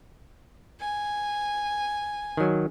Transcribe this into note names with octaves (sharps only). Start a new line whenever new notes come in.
G#5
D#3 F#3